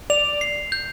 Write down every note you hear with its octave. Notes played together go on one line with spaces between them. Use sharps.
D5 F7
C7
G6